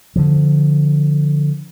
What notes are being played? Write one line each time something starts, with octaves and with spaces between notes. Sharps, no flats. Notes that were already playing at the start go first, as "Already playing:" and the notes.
D3 F3